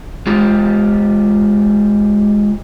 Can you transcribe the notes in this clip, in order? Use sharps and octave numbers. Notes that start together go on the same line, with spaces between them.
G#3 F4 G4